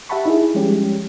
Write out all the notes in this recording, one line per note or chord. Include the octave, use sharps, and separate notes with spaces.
G4 E5 F#5 A5 B5 C#6
D#4 E4 G#4
F3 G3 G#3 C#4 G4